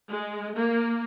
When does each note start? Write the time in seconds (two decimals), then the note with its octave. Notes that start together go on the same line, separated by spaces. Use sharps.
0.10 G#3
0.56 A#3